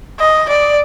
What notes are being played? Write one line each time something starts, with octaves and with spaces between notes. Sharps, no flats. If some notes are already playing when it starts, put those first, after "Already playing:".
D#5
D5